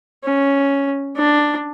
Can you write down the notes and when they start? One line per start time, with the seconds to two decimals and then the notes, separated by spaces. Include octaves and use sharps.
0.24 C#4
1.16 D4